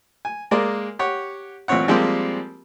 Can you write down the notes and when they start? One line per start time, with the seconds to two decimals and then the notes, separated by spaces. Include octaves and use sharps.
0.25 G#5
0.51 G#3 A#3 A#4 D5
0.99 G4 C#5 F#5
1.68 A1 A#2 C4 C#5 F#5
1.88 F3 G3 G#3 A#3 C4 G4